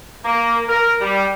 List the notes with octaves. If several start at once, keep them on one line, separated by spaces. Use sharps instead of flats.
A#3
A#4
G3